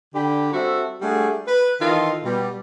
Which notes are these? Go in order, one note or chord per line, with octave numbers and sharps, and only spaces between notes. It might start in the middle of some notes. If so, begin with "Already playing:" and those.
D3 D4 G4 G5 B5
G3 C4 F#4 A4 E5
G3 A3 D4 F#4 G#4
B4
D#3 E3 F4 A4 D#5
B2 G3